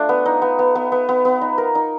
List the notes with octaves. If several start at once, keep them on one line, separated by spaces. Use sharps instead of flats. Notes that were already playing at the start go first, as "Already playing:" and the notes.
Already playing: A3 D4 F4
B3
D#4
B3
B3
B3
B3
B3
B3
D#4
A#4
D#4